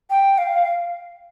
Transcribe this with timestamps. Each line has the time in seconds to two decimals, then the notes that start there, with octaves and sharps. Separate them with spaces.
0.10 G5
0.38 F5